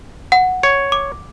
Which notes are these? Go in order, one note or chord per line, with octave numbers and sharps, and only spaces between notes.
F#5
C#5
D6